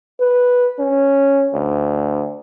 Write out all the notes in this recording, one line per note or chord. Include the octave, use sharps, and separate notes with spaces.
B4
C#4
D2